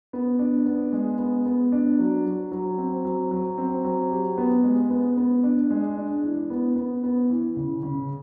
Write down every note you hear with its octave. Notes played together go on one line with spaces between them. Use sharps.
B3
D4
B3
G#3
B3
B3
D4
F#3
F#3
F#3
C4
F#3
F#3
C4
F#3
G4
B3
G#3
B3
B3
D4
G#3
D4
E3
B3
B3
B3
E3
C#3
C#3